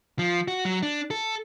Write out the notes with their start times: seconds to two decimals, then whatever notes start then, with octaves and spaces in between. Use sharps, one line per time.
0.19 F3
0.48 F#4
0.65 F#3
0.83 D4
1.11 A4